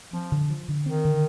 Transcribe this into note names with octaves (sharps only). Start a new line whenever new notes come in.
F3 C4
D3
F3
D3
D#3 C4
D3